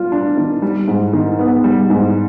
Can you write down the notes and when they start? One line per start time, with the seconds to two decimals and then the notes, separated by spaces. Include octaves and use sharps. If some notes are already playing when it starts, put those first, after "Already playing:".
Already playing: G3 F4
0.12 D4
0.37 D#3
0.62 G3
0.88 G#2
1.13 D#3
1.39 B3
1.64 G3
1.90 G#2